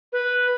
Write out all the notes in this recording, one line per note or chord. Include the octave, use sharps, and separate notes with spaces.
B4